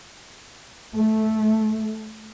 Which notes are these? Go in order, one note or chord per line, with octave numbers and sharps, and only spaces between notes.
A3